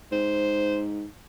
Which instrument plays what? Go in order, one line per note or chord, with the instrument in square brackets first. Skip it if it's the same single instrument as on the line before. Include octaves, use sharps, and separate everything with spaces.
[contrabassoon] G#2 [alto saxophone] C5